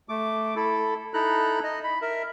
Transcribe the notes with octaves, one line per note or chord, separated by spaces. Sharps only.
A3 D6
E4 A4
D#4 E4 A4 A#5 F#6
D#5
B5
A#4 E5